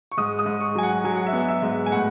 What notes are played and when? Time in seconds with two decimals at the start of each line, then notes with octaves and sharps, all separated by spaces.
0.12 C#6
0.17 G#2 D#6
0.39 D#6
0.46 G#2
0.60 C#6
0.75 F#3 G#5
0.83 F#5
1.04 F#3 G#5
1.16 F#5
1.26 E5
1.33 B3 F#5
1.48 E5
1.62 G#2
1.86 G#5
1.91 A2 F#5